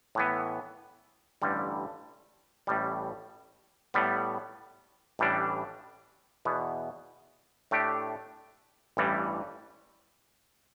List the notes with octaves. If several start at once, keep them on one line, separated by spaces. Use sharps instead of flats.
A2 E3 B3
A1 G2 D3 G3
A1 A2 G3
A2 G3 B3
A1 A2 E3 G3 D4
E2 B2 B3
A2 A3 D4 G4
A1 G2 E3 G3